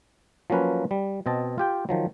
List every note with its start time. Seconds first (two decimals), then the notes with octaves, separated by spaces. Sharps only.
0.50 F3 F#3 A#3 C#4 B4
0.91 G3
1.26 B2 C4 D#5 A5
1.58 F4 G4 G5
1.89 D#3 F3 F#3